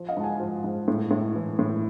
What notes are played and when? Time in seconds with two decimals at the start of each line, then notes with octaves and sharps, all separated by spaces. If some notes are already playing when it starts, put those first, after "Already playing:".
Already playing: F3
0.09 D#5 F5
0.17 G#2 A5
0.24 F#5 G#5
0.40 F3
0.64 G#2
0.88 A2
1.11 A2
1.35 E3
1.59 A2